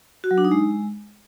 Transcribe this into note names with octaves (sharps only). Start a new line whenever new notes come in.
F#4
F#3
D4
D#4
G#3